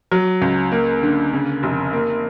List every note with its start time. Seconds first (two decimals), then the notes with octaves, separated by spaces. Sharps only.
0.12 F#3
0.42 C#2
0.72 A#3
1.03 D3
1.33 C#3
1.63 F1
1.93 A#3